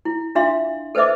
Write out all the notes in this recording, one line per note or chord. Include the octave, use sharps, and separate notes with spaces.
E4
D4 F4 E5 F5 C6
A4 B4 C5 D#5 E5 D6